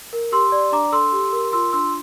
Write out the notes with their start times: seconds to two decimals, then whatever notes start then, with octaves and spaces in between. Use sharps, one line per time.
0.13 A#4
0.32 G4 C6 E6
0.52 D5
0.72 D4 A#5 D6
0.92 A4 C6 E6
1.12 G4
1.33 A#4
1.52 F4 C6 E6
1.73 D4 C6 E6